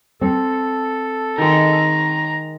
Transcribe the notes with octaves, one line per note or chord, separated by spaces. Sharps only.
C4 A4
D#3 G#3 A#5